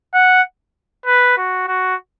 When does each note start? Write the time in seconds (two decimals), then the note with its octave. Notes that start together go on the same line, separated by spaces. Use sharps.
0.14 F#5
1.06 B4
1.38 F#4
1.68 F#4